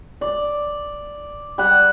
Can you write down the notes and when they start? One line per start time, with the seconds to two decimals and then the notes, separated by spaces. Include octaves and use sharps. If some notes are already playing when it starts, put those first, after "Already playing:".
0.21 D5
1.58 G3 F#5